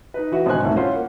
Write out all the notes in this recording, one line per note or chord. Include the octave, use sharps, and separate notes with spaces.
D#4 B4
E3 F#4 B4 F#5
G#1 B2 D3 C5 G#5 F#6
C2 G#2 A3
C#4 E4 F4 C5 F#5
A#3 F#5